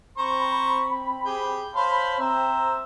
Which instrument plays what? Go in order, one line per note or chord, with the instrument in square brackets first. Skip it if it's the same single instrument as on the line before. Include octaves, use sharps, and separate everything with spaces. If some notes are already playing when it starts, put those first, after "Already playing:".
[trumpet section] C4 B5 [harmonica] C5 A#5 C#6
[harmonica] G4 G#4 G5
[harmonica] C5 F5 C6 [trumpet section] C#5 A5 B5
[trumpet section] C4 A#5 [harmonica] C5 E5